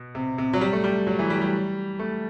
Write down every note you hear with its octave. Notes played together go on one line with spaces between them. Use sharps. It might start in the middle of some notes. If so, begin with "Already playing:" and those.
Already playing: B2
C3
C3
F#3
G3
A3
G3
F#3
E3
G3
G3
A3